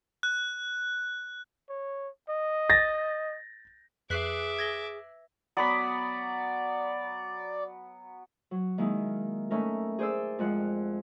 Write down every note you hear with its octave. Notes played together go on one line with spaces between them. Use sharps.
F#6
C#5
D#5
A6 A#6
F2 G#4 B4 E5 D6 F#6 B6 C7
G#6 A#6 G7
F#3 B3 D5 B5
F#3
D#3 G#3 A#3 D#4 E4
A3 C#4 D#4 E4 A#4
G#4 C5 D5 E6
F2 G#3 F#5